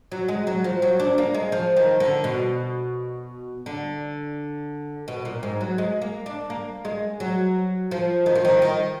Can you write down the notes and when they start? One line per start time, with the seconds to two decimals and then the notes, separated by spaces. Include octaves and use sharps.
0.12 F#3
0.28 G#3
0.47 F#3
0.64 F3
0.82 F#3
1.00 D4
1.18 A#3
1.34 G#3
1.52 F3
1.77 D#3
2.00 D3
2.24 B2
3.66 D3
5.08 B2
5.25 A#2
5.43 G#2
5.61 F#3
5.78 G#3
6.02 A#3
6.26 D4
6.50 A#3
6.85 G#3
7.20 F#3
7.91 F3
8.26 D#3
8.35 F3
8.45 D#3
8.62 D#3